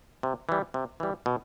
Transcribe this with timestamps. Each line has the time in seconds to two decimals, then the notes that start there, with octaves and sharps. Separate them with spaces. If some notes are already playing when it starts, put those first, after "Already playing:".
0.23 C3
0.49 E3 G3
0.74 C3
1.00 E3 G3
1.26 B2